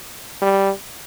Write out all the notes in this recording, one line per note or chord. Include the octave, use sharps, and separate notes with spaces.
G3